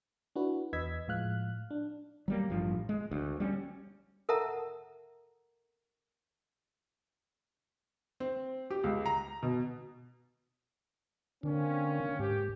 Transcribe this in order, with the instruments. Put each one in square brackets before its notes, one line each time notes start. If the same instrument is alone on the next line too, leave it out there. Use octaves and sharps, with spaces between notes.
[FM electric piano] D4 E4 F#4 B4
E2 B4 D#5 E6 G#6 B6
A2 F3 G#3 F5 F6 F#6
D4
[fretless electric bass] F#3 G3 A#3
A1 G2 F3
G#3
D2
G3 B3 C#4
[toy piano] A4 A#4 E5 F#5 A5 A#5
[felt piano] C4
G4
C#2
A#5
B2
[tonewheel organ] D3 [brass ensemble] A#3 C4 C#4
[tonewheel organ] G#2 [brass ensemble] G4